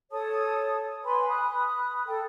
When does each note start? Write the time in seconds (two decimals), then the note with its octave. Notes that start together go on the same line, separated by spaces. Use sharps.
0.11 A4 C#5 A5 D#6
1.04 B4 G#5 B5 C6
1.28 B5 D#6 F#6
2.07 A4 G5